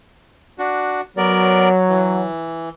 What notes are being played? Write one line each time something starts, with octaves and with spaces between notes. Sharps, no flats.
D4 F#4
F#3 B3 A#4 D5
E3